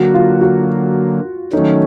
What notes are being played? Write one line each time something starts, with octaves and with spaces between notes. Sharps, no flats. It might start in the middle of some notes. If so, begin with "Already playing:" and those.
Already playing: D3 F#3 A#3 F#4
F4
F#4
D#3 F#3 A3 C#4 D#4